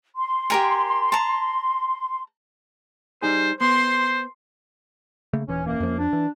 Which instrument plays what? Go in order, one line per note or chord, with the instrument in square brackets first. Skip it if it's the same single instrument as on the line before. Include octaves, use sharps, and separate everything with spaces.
[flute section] C6
[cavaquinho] G4 A#4 G#5
A5 A#5
[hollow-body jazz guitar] G3 D#4 G#4 [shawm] C5
[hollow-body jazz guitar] B3 [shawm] C5 [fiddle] C6
[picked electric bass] C#3 A3 A#3
[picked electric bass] D#1 E3 [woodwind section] C#4
[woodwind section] F#2 A#3
[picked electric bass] F2 F3
[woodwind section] D4
[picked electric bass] E3